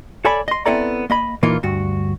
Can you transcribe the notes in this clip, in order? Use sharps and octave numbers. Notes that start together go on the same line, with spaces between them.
A4 C#5 D5 G#5 A5 B5
D#5 C6
B3 C4 E4 A4 D5 A#5
A#3 D#5 B5
A#2 E3 A#3 D#4 F4
D2 G2 F#4